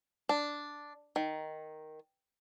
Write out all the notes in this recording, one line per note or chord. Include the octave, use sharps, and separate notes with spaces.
D4
D#3